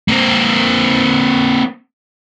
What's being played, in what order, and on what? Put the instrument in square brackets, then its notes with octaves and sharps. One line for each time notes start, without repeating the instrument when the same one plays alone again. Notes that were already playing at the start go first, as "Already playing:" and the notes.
[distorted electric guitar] A#3 C4